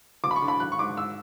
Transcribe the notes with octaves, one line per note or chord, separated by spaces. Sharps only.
D2 D6
B5
C#6
D3
B5
G#1 F#6
C#6
G#2 D6
E6